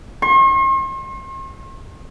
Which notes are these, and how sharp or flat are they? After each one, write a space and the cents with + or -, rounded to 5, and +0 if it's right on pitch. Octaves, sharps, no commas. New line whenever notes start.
C6 +45